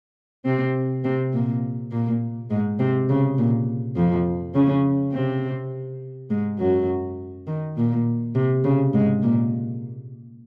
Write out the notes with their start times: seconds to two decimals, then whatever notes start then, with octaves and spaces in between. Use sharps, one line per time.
0.45 C3 C4
1.04 C3 C4
1.33 A#2 A#3
1.91 A#2 A#3
2.50 G#2 G#3
2.79 C3 C4
3.09 C#3
3.38 A#2
3.96 F2 F3
4.55 C#3 C#4
5.13 C3 C4
6.30 G#2 G#3
6.59 F#2 F#3
7.47 D#3
7.77 A#2
8.35 C3
8.64 C#3
8.93 G#2 G#3
9.22 A#2 A#3